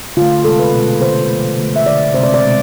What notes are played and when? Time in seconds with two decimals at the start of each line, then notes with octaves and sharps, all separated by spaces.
0.17 D3 F4
0.21 A3
0.44 C3 G#3 A4
0.59 B4
0.73 B2 G#3
1.01 D3 G#3 C5
1.29 C3 F3 A3
1.57 D3 A3
1.76 E5
1.86 D3 A3 D5
2.14 C3 G#3 C5
2.23 D5
2.34 D5
2.43 B2 G#3